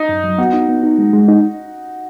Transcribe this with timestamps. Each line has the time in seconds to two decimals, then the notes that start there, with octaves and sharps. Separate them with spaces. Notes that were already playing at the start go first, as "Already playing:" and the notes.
Already playing: D#4
0.09 F#2
0.24 F#3
0.38 B3 F#4
0.53 D#4
0.69 B3
0.83 D#4
0.98 G#3
1.13 G#3
1.28 D#4